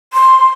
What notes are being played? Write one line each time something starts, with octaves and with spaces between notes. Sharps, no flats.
C6